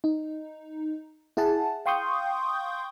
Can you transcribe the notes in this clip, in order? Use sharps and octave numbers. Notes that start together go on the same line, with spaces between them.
D#4
E4 G#4 F#5 A5
F5 G5 C6 C#6 D#6 G6